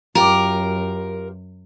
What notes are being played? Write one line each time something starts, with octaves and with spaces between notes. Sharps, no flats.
F#2 F4 G4 A#4